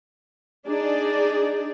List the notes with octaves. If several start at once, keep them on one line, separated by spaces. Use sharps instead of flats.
D4 D#4 G#4 D5